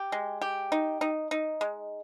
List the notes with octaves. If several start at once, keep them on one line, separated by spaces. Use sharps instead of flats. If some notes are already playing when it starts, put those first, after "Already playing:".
Already playing: G4
G#3
G4
D#4
D#4
D#4
G#3